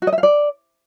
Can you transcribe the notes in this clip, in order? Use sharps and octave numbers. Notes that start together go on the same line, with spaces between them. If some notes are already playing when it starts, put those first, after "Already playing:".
F#4
D#5
E5
F5
D5